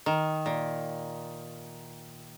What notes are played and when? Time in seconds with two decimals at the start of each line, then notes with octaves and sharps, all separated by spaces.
0.06 D#3
0.46 A#2